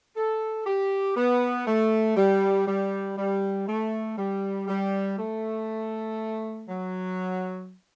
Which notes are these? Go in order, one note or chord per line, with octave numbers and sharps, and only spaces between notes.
A4
G4
B3
A3
G3
G3
G3
A3
G3
G3
A3
F#3